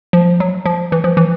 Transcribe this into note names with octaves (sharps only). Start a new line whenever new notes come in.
F3
F#3
F3
E3
F3
E3